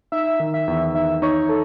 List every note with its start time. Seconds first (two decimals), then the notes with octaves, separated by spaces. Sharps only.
0.12 D#4 E5
0.40 D#3
0.54 E5
0.68 E2
0.94 D#3 E5
1.22 D#4 C#5
1.49 A4